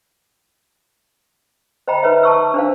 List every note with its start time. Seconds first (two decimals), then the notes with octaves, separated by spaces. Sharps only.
1.88 C5 D#5 G5 A#5 B5
2.03 D#4 B4 C#5 E5
2.23 A5 C#6 E6
2.54 D4 C5 F5